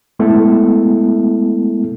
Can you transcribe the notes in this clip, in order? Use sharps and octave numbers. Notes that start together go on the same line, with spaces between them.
G#3 A3 B3 E4 A4